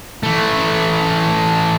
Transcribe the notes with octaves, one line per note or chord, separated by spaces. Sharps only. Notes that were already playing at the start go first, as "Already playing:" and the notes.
E3 A3